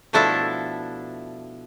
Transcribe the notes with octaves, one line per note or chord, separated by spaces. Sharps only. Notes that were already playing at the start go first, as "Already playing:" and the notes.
B2 F3 A3 D4 E4 A4